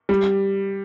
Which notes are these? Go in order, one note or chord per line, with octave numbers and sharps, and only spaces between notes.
G3